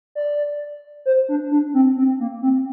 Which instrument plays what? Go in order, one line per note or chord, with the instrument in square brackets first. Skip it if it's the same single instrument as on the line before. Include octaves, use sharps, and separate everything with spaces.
[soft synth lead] D5
C5
D4
D4
C4
C4
A#3
C4